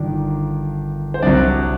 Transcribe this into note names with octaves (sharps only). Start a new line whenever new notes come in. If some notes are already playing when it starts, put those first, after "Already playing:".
Already playing: G1 G2 D#3 D4
C5
C2 C3 F#3 D4 D5